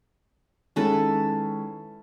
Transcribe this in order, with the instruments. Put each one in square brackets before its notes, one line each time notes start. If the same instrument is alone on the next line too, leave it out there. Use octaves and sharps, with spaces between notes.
[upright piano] D#3 G#3 C#4 [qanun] E4 A4 B4